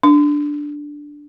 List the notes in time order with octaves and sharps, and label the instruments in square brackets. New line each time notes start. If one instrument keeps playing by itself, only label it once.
[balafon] D4